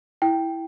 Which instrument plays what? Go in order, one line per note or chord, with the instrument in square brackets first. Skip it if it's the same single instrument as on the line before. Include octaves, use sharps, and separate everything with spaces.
[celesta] E4 G5